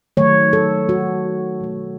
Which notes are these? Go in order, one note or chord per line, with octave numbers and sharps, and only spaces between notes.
D#3 F#3 A3 C#5
A4
F#4
B2 A3